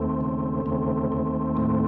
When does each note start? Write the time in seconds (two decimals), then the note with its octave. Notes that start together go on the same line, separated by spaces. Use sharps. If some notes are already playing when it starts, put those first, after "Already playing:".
Already playing: D#2 A3 C4
0.21 C#3
0.66 D#2 A3 C4
1.12 D#2
1.57 A2